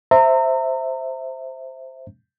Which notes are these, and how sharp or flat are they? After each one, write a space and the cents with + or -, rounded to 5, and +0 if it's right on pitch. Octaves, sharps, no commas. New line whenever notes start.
C5 +0 E5 +0 A#5 -35